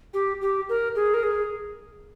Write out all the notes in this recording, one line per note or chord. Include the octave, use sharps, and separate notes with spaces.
G4
G4
A#4
G#4
A#4
G#4